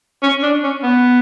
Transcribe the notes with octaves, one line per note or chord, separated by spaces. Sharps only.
C#4
D4
C#4
B3